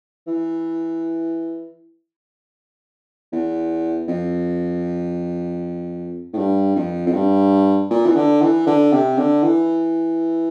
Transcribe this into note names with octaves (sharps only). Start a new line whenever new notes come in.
E3
E2
F2
A2
G2
F2
F2
G2
A#2
E3
D3
E3
D3
C3
D3
E3